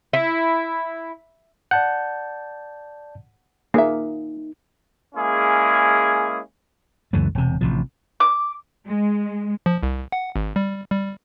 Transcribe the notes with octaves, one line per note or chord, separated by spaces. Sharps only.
E4
D5 F#5 A5 G6
A#3 D#4 G#4 E5
G#3 A#3 C#4 E4 G#4
C#2 F#2 E3 A3
E1 C3
A1 C3 F3
D6
G#3
F3
C2
F#5
G#1
G3
G3